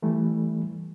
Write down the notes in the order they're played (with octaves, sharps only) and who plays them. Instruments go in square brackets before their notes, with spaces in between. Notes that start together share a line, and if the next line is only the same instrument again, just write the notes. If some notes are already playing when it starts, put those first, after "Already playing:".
[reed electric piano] E3 G3 A3